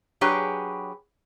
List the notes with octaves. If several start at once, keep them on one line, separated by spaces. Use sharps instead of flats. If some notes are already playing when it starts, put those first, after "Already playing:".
F#3 D4 G4 G#4 B4 C#5